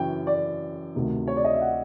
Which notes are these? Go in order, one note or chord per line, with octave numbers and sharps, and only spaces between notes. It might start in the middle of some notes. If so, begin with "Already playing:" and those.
Already playing: F#2 C#3 E3 G5
D5
D2 C3 D#3
C#5
D5
D#5
E5
F#5